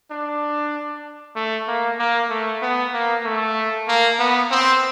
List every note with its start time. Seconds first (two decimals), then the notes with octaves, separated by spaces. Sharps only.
0.11 D4
1.36 A3
1.68 A#3
1.98 A#3
2.30 A3
2.62 B3
2.93 A#3
3.25 A3
3.88 A#3
4.19 B3
4.50 C4